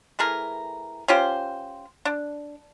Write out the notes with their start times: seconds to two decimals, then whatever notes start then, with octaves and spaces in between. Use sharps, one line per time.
0.19 E3 A3 G#4 A#4
1.08 C#4 F4 G4 C5
2.05 D4